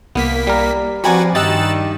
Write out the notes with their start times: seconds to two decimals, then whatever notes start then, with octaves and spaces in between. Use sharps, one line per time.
0.15 C2 A#3 B3 B6
0.47 G3 A#4
1.04 F3 C4 F#4 B4 D5 G#5 A#5
1.35 G2 D#3 D#4 G4 D#6 E6 F#6 A6